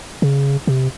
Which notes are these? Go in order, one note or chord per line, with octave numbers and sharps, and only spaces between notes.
C#3
C3